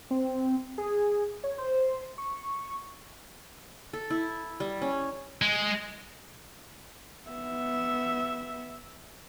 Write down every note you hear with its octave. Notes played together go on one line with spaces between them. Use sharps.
C4
G#4
C#5
C5
C#6
A4
E4
G3
C#4
G#3
B3 E5